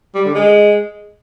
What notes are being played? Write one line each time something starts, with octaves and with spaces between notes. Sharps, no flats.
G3
D3
G#3